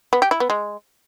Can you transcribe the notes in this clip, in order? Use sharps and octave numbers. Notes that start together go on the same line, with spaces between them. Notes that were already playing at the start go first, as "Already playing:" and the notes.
B3
G4
E4
B3
G#3